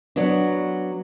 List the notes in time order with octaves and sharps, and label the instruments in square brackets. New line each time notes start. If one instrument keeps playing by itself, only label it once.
[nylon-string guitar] F#3 B3 D4